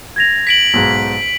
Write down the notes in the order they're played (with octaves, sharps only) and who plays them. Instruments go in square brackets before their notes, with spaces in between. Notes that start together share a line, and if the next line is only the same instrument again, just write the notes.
[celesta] G#6 A#6 F7
[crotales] B6 D7 F#7
[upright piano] B1 G#2